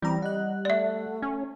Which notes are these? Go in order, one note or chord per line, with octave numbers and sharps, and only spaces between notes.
E3 G3 C4 A#5
D#5 F#5 F#6
A3 D5 E5
C#4